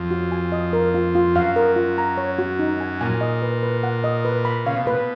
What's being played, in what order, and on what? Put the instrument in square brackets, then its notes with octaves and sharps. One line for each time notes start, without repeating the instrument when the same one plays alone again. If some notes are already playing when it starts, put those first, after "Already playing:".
Already playing: [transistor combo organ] F2
[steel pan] F#4
G#5
D#5
A#4
F4
F4
[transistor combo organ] F#2 [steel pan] F5
[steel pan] A#4
F4
A#5
C#5
F#4
D#4
G#5
[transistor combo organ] A#2 [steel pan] G#5
[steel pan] D#5
B4
B4
F#5
D#5
B4
B5
[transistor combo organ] C#3 [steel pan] F5
[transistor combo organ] B2
[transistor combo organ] A#2 [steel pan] B4
[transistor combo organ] B2